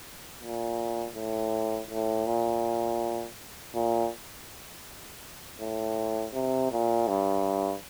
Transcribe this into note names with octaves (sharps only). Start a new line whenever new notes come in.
A#2
A2
A2
A#2
A#2
A2
C3
A#2
G2